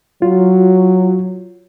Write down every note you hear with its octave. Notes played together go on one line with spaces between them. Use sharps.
F#3 F4